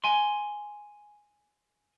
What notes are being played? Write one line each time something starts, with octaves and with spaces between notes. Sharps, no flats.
G#5 C6